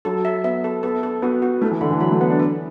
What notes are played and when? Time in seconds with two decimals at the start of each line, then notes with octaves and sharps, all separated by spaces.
0.05 F#3 A4
0.25 E5
0.44 B3 E5
0.64 A4
0.83 B3 A4
1.03 A4
1.22 B3 F#4
1.42 F#4
1.62 A3 E4
1.71 E3
1.81 D3 B5
1.91 E3
2.00 F#3 B5
2.11 A3
2.21 B3 F#5
2.30 D4
2.39 B4